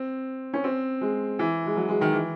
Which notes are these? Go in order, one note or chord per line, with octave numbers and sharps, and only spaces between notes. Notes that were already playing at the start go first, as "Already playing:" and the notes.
Already playing: C4
C#4
C4
G#3
E3
G#3
F#3
G#3
D#3
E3